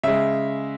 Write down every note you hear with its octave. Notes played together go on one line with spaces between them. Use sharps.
C#3 G#3 E5